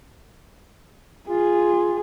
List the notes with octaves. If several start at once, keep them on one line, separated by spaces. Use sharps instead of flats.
F4 G#4